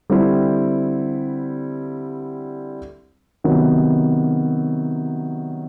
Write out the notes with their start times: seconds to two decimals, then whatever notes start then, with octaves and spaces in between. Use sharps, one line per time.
0.10 D3 G3 C4 E4
3.44 C3 D#3 F#3 B3